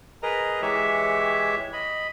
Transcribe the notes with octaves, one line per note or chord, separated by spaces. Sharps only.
G#4 A#4 B4 D#5 A#5
E3 G#3 G4 C#5 E5
D#5 B5